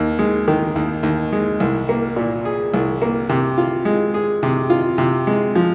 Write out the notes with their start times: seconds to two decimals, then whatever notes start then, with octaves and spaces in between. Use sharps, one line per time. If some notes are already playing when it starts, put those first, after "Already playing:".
Already playing: D#2
0.19 G#3
0.48 D#3
0.76 D#2
1.03 D#2
1.33 G#3
1.60 C2
1.89 A#3
2.16 A#2
2.45 G#4
2.74 C2
3.02 A#3
3.29 C3
3.58 F4
3.85 G#3
4.14 G#4
4.43 C3
4.70 F4
4.98 C3
5.27 G#3
5.55 F3